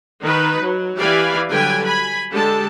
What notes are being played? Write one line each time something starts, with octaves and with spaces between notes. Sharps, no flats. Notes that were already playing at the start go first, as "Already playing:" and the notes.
D#3 D#4 B4
F#3
E3 G4 D5 F5 G#5 B5
D3 F#3 G3 B4 G5 G#5
G#5 B5
D3 G#3 G4 A4 A5